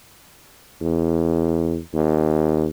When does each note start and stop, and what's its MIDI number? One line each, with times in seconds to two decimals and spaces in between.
0.81 1.78 40
1.94 2.68 39